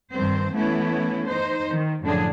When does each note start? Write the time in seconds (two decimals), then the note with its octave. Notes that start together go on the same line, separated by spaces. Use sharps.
0.12 G2 D#3 C4 C5
0.53 E3 A3 B3 C#4 E4
1.25 D#4 C5
1.69 D#3
2.02 F#2 A2 D3 F3 D4 G#4